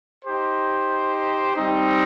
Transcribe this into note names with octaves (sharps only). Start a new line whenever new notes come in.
D#4 G4 C5
G3 C4 D#4